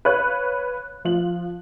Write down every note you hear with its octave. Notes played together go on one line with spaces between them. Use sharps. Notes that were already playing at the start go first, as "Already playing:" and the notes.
B4 C#5 F5 F#6
F3 F4 F#7